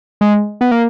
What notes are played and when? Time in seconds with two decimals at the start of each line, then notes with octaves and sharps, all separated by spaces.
0.21 G#3
0.61 B3
0.71 A#3